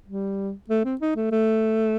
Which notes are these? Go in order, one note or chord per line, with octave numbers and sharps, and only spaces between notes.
G3
A3
C4
D#4
A3
A3